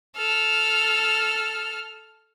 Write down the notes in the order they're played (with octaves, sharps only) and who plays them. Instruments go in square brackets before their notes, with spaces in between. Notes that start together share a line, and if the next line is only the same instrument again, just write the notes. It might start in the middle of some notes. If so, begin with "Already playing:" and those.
[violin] A4 F6